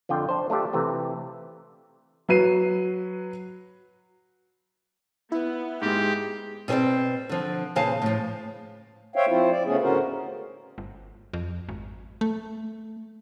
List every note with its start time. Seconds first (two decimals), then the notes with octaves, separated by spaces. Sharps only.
0.09 F2 D3 F4 G5
0.29 D4 C5
0.50 A3 D4 F4 G4
0.73 C3 E3 A3 C4
2.29 F#3 B4 C7 D#7
5.32 B3 E4
5.82 G#2 G#3 G4
6.68 B2 C4 G#4 C5 D5
7.29 D3 F3
7.76 E2 A#2 C#3 C5 F5 A5
8.02 A2 F3
9.16 C5 C#5 E5 F5 G5
9.29 F3 C4 E4 F4 C5
9.50 D5
9.65 C#3 A3 B3 C#4 G#4
9.82 A2 D3 C#4 F#4 A#4 C5
10.00 E2
10.78 G1
11.33 F2
11.69 G#1
12.21 A3